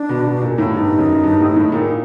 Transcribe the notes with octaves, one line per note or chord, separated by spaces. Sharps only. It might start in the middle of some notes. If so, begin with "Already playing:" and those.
Already playing: D4
B2
B2
A#2
A2
G2 D#4
F#2
G2
A2
A2
A#2